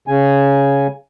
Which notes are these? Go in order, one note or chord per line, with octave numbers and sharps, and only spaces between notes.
C#3 G#5